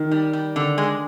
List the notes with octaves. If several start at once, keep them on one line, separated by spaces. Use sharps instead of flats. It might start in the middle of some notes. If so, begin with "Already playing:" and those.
Already playing: D#3
G3
G3
D3
G#3